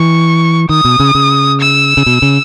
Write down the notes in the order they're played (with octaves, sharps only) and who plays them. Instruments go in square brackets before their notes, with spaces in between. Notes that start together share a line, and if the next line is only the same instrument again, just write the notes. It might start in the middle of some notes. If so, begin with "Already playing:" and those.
Already playing: [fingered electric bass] E3 [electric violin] C#6
[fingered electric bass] D#3 [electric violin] D#6
[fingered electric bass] B2
C#3
C#3
[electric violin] E6
[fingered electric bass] C#3
B2
C#3